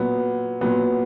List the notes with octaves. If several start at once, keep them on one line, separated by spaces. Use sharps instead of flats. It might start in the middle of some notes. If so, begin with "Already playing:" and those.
Already playing: A#2 F#3 B3
A#2 F#3 B3